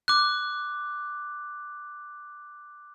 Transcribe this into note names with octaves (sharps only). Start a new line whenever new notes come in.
D6 F#6